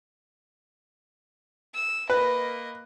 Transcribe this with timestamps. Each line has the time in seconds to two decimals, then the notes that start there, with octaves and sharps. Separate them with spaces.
1.74 E6
2.10 A#3 B4 D#5